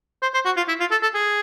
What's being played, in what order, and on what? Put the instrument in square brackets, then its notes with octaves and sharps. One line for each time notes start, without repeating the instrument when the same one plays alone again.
[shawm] C5
C5
F#4
F4
E4
F4
A4
A4
G#4